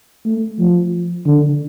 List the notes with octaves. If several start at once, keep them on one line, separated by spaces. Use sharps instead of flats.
A3
F3
D3